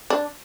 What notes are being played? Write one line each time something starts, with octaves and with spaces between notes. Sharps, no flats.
D4